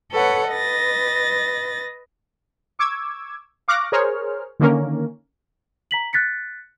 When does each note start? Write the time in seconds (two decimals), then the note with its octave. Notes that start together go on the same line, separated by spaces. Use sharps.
0.12 A4 B4 C#5 F#5
0.49 B4 D#5 A6 A#6
2.79 C#6 D6 E6 G#6
3.68 F5 C#6 D6 F6 F#6 A#6
3.92 G#4 A#4 C5 C#5 F6
4.60 D3 D#3 A#3 C#4 A#4
5.91 A#5 B6 F#7
6.13 F#6 A6 B6 C#7